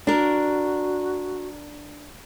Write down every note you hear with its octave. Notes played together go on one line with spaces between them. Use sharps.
D4 F#4 A#4